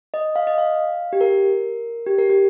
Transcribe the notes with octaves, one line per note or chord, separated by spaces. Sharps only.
D#5
F5
D#5
F5
G4
A#4
G4
A#4
G4